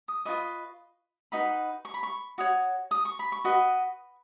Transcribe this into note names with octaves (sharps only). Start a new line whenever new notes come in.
D#6
F4 B4 D#5 C#6
D#4 F#4 B4 D#5 B5
C#6
B5
C#6
F#4 C#5 D#6
D#6
C#6
B5
C#6
F#4 B4 D#5